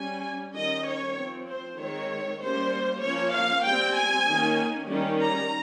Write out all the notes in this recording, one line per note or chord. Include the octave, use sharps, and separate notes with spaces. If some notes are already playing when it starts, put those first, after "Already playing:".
Already playing: G3 C#4 G#5
D#3 G3 C#4 D#5
C#5
F3 C4
C5
D#3 G#3 C4 C#5
G3 A#3 C#4 C5
F3 A#3 C#4 C#5
F5
G3 C4 G5
G#5
D#3 A#3 C#4
D#3 G3 C#4
A#5